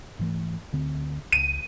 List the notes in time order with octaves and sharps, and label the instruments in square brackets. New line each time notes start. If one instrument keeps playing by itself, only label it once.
[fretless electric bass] G#2 E3 A3
D2 D3 C4
[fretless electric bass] C#2 [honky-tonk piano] D#7